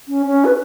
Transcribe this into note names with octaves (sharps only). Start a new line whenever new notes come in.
C#4
C#4
B4